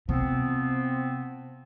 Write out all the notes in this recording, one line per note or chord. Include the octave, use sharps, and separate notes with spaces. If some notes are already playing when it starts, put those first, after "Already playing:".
C3 F3 B3 C4